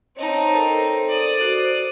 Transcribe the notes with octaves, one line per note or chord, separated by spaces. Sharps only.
C4 D#4 C#5 D#5 A5
A4 A#4 C5
D5 D#6
F#4 C5